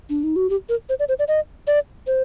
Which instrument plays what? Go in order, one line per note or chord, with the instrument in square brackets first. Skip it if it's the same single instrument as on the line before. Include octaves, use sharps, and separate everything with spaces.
[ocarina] D4
D#4
F#4
G4
A#4
C5
D5
C5
D5
D#5
D5
C5